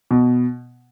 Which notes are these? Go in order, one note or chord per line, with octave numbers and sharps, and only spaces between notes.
B2